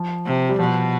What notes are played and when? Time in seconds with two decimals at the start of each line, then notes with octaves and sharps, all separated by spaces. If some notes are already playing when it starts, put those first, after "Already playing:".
Already playing: F3
0.26 C3
0.49 G3
0.59 B2 F3